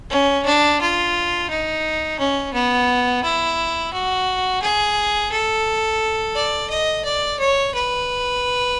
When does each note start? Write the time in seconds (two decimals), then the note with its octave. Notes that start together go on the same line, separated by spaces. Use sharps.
0.10 C#4
0.45 D4
0.81 F4
1.50 D#4
2.19 C#4
2.53 B3
3.24 E4
3.93 F#4
4.62 G#4
5.32 A4
6.35 D5
6.70 D#5
7.04 D5
7.39 C#5
7.74 B4